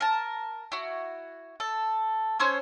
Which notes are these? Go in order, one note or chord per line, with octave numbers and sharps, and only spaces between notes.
A#4 A5
E4 F#4
A4
C#4 C5 C#5 E6